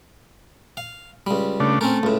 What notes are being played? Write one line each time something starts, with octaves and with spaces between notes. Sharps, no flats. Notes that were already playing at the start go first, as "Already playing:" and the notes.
F5
C#2 G3
C#3 A3 D4
A3 C4 C#4 A#4
C#2 A2